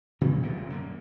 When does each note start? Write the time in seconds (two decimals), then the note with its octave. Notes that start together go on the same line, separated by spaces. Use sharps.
0.21 A#2 C#3 F#3 A#3
0.42 D#1 C2 A#2 C#3
0.70 F#2 D3 A#3